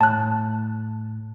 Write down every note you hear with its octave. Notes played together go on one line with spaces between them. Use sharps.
A2 A5 F#6